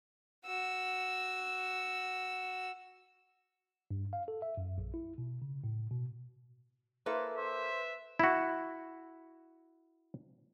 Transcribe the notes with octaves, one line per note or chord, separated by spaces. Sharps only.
F#4 E6
G2
F5
A4
E5
F#2
A#1
E4
B2
C#3
A2
B2
A#3 E4 A4 B4 C5
C5 E5
E4 F#4